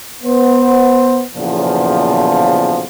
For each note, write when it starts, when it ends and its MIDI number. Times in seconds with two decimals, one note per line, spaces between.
0.23 1.21 59
0.23 1.21 72
1.35 2.85 35
1.35 2.85 40
1.35 2.85 46
1.35 2.85 49
1.35 2.85 53